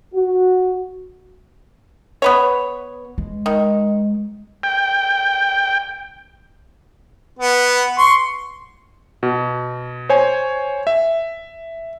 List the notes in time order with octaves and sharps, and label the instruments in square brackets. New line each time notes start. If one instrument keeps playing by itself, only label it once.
[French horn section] F#4
[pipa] B3 B4 C#5
[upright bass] G#3
[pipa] D#3
[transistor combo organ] G5
[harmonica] B3
C6 C#6
[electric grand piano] B2
C5 C#5 G#5
E5